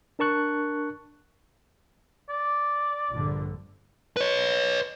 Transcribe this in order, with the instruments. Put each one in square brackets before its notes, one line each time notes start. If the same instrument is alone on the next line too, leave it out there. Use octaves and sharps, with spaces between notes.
[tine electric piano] D4 A#4 A5 C#6 F#6
[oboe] D5
[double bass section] A#1 G2 D3
[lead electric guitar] B4 C#5